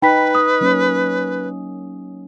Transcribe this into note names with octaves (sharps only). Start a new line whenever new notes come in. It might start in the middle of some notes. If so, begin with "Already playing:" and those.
D#4 B4 G5 B5 B6
D#6
F#3 A#3 C#4